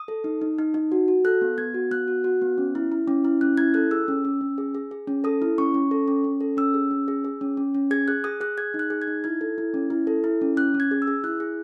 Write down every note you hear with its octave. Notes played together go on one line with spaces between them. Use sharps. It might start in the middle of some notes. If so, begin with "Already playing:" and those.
Already playing: D#6
A4
D#4
D#4
D#4
D#4
F#4
F#4
A4 F#6
B3
B3 G#6
F#4
B3 F#6
F#4
F#4
B3
C#4
E4
E4
C#4
E4
C#4 F#6
E4 G#6
A4 F#6
G#4 E6
C#4
C#4
C#4
G#4
G#4
G#4
C#4
A4 D#6
E4
C#4 C#6
C#4
A4
C#4
C#4
A4
C#4 E6
G#4
C#4
G#4
G#4
C#4
C#4
C#4
G#4 G#6
G#4 F#6
G#4 D#6
G#4 F#6
G#4 G#6
D#4
F#6
G#4
G#6
D#4
E4 G#6
A4
E4
C#4
E4
A4
E4
C#4
C#4 F#6
C#4
G#6
G#4
E6
G#4
E4 F#6
G#4